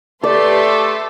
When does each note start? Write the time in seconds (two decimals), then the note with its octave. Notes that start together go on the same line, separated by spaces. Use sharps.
0.23 A3 G4 A4 B4 D5 C6